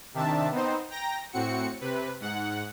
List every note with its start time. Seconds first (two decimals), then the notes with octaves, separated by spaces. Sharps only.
0.14 C3 D#3 D4 E5 A5
0.51 B3 C4 D#4 C5
0.90 G5 A#5 A#6
1.32 A2 C4 F#4 C#7
1.80 C3 B4
2.20 G#2 F#5